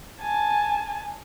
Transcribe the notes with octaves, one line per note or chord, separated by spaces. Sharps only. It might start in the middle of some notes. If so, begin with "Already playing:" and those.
G#5 A5